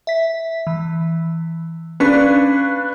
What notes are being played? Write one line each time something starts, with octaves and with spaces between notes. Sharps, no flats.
E5 B6
E3
C#4 D4 B4 F5 C#6